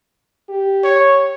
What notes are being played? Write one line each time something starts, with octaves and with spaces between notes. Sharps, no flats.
G4
C#5